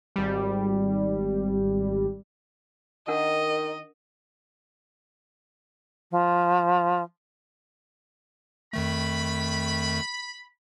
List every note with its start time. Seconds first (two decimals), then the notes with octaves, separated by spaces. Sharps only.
0.16 G#1 G3
3.08 D#3 D4 A#4 D#5 F#5
6.12 F3
8.73 F2 D#3 A3 B5